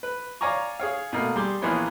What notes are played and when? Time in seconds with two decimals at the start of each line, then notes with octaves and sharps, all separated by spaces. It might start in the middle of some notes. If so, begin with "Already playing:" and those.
0.03 B4
0.41 C#5 D5 F5 G#5 A#5 C#6
0.79 G#4 C#5 F5
1.13 B2 A3 A#3
1.36 G3 G#4 C6
1.62 A#1 E3 A#3 B3 C#5 C6